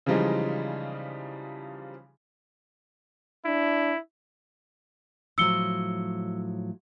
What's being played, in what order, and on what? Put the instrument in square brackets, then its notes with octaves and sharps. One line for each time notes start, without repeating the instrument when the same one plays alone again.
[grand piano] C#3 E3 F3 G3 G#3 D#4
[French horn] D4 [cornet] E4
[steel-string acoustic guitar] A2 F3 F#3 [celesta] E6 C#7 G7